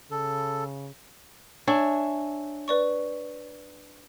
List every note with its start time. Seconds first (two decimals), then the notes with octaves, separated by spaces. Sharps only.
0.11 C#3 A4
1.67 D4 C#5 E5 G#5
2.68 B4 D5 C#6